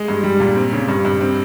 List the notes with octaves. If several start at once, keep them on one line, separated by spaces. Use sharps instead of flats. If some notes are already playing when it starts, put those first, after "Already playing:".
Already playing: G#3
G2
G3
A#2
C4
C#3
G2
G2
C4